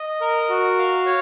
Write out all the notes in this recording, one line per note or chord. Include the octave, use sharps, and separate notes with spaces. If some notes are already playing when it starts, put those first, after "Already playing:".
Already playing: D#5
A#4
F#4
F5
C#5